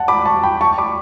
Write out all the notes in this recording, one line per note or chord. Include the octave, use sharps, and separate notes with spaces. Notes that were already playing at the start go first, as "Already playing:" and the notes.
Already playing: F#5 A5
B5 D6
A5 C#6
G5 B5
A5 C#6
B5 D6